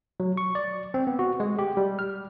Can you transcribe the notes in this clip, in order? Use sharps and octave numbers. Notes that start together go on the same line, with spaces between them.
F#3
C#6
D5
C4
B3
F#4
G#3
G4
G3
F6